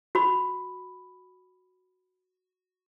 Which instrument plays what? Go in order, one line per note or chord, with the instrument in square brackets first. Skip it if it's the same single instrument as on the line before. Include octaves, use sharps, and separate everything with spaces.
[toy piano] F#4 B5